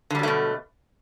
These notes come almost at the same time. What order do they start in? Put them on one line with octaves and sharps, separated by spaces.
D3 G3 F#3 A3 B2